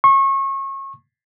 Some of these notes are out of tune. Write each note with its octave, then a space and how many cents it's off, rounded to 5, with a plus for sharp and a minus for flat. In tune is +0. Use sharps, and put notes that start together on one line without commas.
C#6 -30